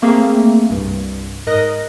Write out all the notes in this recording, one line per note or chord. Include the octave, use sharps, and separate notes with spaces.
A3 A#3 C4 G#4 E5 F5
C2 G2
G#2 A#4 D#5 D#6 F#6 A#6